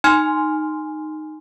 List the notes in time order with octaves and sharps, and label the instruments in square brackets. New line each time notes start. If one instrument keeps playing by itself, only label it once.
[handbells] D#4 G#5 C6 F6